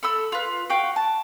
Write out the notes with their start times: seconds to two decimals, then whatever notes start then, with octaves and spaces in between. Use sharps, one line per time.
0.03 A4 B5 E6
0.32 F4 B4
0.70 F#4 F5 G5
0.96 A5